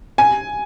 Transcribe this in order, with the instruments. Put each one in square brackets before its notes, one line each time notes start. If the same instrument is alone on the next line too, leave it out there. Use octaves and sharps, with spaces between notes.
[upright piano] G#5